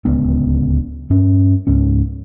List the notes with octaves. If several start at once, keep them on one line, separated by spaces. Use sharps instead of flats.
D1 C#2 B3 D4
G2 C#4
C#2 G#2 C#4